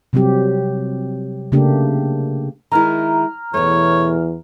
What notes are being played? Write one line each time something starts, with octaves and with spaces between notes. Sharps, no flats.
C3 F#3 G3 C4 G4
C#3 A3 A#3 D4 G4
D#3 G#3 E4 A#5 F6
E2 B2 E3 A3 C#5